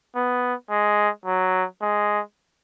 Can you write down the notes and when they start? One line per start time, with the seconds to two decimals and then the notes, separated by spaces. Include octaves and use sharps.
0.15 B3
0.70 G#3
1.26 F#3
1.81 G#3